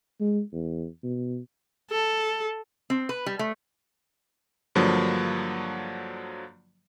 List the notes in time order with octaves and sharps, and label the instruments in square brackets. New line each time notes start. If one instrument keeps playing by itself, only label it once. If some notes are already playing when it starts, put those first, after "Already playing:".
[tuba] G#3
E2
B2
[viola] A4
[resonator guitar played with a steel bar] C4
B4
G3
A3
[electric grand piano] G2 D3 F3 F#3 A#3